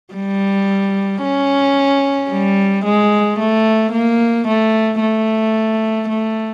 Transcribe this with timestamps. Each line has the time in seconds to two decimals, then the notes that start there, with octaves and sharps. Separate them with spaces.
0.14 G3
1.23 C#4
2.30 G3
2.84 G#3
3.39 A3
3.92 A#3
4.47 A3
5.01 A3
6.08 A3